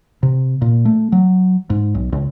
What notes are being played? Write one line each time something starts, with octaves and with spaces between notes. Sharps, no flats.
C3
A#2
A3
F#3
G#2
B1
C#2